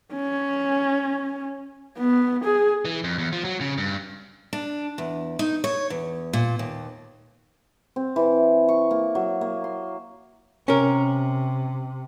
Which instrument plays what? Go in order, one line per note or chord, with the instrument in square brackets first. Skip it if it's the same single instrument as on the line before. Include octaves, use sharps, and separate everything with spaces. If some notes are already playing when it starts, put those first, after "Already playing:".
[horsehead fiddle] C#4
B3
G#4
[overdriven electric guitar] E3
F2
E2
F3
F#3
C#3
G2
[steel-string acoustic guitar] D4
E2
D#4
C#5
E2
A#2
D#2
[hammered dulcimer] C4
E3
C#6
A#3
F#3
A#3
C6
[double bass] C3 [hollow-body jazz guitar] C#4 A#4